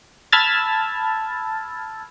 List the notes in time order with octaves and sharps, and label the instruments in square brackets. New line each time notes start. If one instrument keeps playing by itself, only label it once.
[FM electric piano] A5 B5 E6 F6 G#6 A6